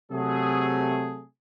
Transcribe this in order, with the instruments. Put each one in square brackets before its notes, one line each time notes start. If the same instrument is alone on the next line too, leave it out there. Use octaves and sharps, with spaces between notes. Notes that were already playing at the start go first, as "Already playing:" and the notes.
[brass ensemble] C3 F#3 A3 G#4